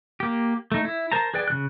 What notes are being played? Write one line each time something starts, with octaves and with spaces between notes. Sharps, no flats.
A#3 G4
A3 D#4
E4
A#4 C5 A5 A#5
G#4 B4 D5 G5
C#3 F3 F#6